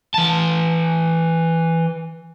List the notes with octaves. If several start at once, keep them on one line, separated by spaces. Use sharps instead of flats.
E3 A5